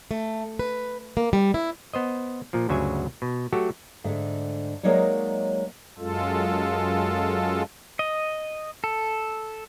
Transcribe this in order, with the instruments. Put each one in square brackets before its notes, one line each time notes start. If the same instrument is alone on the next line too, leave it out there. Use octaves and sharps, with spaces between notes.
[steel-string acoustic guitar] A3
B4
A#3
G3
E4
[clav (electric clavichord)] B3 C5 D#5
A#2 F3
G1 D2 C#3 F#3 E5 G#5
B2
F#3 A3 F#4 G4 A4
[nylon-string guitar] G#2 D3 A3
F#3 G#3 A#3 D#4 C#5 D5
[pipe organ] F#2 G#3 F4 A4
[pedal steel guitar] D#5
A4